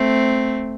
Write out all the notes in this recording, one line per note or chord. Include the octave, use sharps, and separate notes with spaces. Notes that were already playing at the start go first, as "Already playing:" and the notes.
Already playing: A3 C4